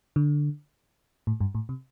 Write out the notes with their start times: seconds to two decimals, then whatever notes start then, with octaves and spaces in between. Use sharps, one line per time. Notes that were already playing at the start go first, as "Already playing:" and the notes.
0.16 D3
1.27 A2
1.40 G2
1.55 A2
1.69 C3